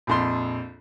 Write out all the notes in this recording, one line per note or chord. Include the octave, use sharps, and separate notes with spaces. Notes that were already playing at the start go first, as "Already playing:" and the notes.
A#1 F2 C6